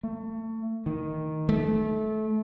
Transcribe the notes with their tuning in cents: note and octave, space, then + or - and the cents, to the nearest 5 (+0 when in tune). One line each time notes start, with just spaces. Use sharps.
A3 +30
D#3 +5
A3 -25